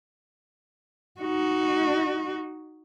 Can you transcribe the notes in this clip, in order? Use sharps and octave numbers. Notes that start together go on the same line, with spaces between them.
D#4 F#4